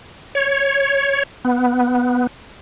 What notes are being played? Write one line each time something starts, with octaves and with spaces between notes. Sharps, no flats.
C#5
B3